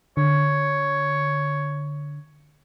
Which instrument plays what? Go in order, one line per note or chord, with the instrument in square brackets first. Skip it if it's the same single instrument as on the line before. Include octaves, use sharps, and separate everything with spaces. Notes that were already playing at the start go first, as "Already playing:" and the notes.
[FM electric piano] D3 [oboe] C#5